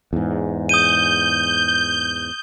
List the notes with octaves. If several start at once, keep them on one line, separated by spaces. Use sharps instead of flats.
E2 G#2
D#6 G6 D#7